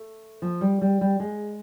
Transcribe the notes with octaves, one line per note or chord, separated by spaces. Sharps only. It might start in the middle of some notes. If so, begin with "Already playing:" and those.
Already playing: A3
F3
G3
G3
G3
G#3